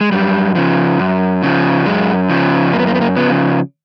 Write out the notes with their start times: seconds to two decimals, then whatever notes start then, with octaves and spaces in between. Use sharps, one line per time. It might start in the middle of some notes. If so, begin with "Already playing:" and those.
0.01 G#3
0.12 F#2 G3
0.55 C#3 F3
0.99 F#2
1.43 C#3 F3
1.86 F#2 G#3
2.29 C#3 F3
2.73 F#2 A#3
2.79 B3
2.87 A#3
2.95 B3
3.01 A#3
3.16 C#3 F3 B3